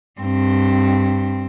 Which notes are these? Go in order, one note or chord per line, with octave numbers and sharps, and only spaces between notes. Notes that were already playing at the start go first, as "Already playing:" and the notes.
G2 C4